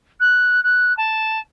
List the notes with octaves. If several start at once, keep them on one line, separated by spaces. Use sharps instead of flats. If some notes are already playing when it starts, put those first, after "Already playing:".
F#6
F#6
A5